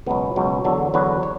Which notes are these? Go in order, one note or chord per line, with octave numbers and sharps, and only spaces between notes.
C#2 B2 F#3 B3
C#2 B2 F#3
E2 D3 F#3 A4
E2 D3 F#3 B4
C#5